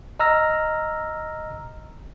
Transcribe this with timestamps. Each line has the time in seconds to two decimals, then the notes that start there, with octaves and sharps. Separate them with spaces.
0.20 D#5 A#5 E6 F6 A#6